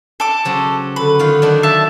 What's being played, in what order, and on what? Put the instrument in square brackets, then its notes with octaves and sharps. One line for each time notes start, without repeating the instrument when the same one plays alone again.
[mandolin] A4 D6
[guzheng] C#3 F#3 C4
[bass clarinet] D3 [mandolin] B4
[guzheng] D#3 F4 F5
D#3 F#3 D4
[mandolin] E5 A5